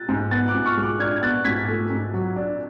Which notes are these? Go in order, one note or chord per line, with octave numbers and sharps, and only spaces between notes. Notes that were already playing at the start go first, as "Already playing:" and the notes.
Already playing: F#6 A6
G#2
B3 F#6 A6
D6 F#6
G#2
C#6 F6
G#3
D6 F#6
D4 F6 G#6
G#6
B3 F#6 A6
G#2 G#6 B6
A3
G#2
F#3
D4